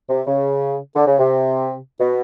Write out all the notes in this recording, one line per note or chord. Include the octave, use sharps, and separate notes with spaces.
C3
C#3
D3
C#3
C3
B2